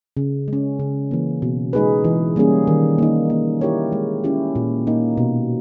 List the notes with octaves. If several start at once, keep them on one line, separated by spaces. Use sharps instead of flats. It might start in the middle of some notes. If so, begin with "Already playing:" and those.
C#3
G#3 C#4
C#3
E3 A#3
B2
G#3 D#4 G#4 B4
E3
G3 A#3 C#4 G#4
D#3
A#3 D#4
A#3
E4 G4 A#4 C#5
G#3
C#4 E4 G4
A#2
A#3 D#4
B2